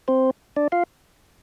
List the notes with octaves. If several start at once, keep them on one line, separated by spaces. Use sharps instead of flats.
C4 C5
D4 D5
F4 F5